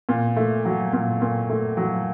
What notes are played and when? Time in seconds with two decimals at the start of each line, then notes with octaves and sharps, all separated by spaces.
0.09 A#2
0.36 A3
0.65 F#3
0.93 A#2
1.22 A#2
1.49 A3
1.77 F#3